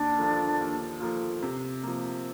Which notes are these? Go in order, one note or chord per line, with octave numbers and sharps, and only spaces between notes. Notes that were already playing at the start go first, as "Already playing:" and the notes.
Already playing: D#2 D4
D3 F3 A#3 F4
D#2
D3 F3 A#3 F4
C3
F3 A#3